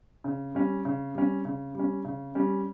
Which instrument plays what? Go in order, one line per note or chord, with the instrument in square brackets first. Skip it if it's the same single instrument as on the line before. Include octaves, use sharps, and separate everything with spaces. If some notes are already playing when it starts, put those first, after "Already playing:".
[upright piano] C#3
G3 C#4
C#3
G3 C#4
C#3
G3 C#4
C#3
G3 C#4